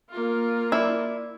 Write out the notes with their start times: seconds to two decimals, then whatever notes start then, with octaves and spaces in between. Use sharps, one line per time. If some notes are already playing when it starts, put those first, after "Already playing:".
0.10 A#3 F4
0.72 E4 D5